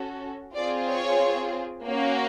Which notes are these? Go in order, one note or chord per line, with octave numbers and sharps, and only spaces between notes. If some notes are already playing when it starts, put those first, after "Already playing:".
Already playing: C#4 F#4 A4
C4 F4 G#4 D5
C#5
A#3 C#4 F#4